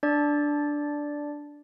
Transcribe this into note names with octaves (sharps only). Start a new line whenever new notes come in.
D4 D5